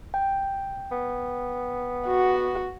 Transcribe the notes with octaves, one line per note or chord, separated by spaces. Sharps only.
G5
B3
F#4